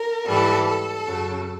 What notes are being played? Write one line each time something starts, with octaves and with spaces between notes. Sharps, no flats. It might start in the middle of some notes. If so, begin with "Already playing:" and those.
Already playing: A#4
G#2 E3 G3 A4
A4
F#2 C#3 F#3